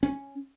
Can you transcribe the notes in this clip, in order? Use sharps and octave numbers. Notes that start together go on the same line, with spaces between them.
C#4